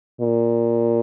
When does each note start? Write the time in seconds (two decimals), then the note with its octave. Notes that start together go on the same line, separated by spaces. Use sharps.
0.21 A#2